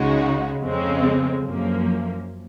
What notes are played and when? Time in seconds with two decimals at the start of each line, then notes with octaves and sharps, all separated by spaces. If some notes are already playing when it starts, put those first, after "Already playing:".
Already playing: C#2 C#3 G#3 D#4 F#4
0.63 F2 C#3 G#3 C4
1.44 F#2 F3 A#3